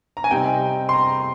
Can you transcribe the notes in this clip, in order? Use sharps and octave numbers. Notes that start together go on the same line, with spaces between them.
A#5
G#5
C3 G3 C4 D#4 G5
C6
A#5